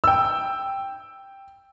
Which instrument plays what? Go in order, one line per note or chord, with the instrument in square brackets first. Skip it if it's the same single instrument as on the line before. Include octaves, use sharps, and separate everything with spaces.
[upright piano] G5 E6